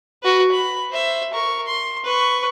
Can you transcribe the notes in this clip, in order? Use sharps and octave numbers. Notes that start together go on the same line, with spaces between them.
F#4 B4
B5
C5 E5
A#4 C#6
C6
B4 C#6